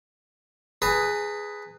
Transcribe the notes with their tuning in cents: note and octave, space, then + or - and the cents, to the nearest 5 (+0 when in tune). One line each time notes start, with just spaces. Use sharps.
G#4 +0 B4 +5 A#5 -45